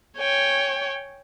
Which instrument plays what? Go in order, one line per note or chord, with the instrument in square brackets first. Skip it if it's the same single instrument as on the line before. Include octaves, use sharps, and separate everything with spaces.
[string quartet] C#5 G5 G#5